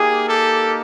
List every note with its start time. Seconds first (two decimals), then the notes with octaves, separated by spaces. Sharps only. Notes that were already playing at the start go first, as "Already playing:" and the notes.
Already playing: A#3 D#4 G4 G#4
0.29 G4 A4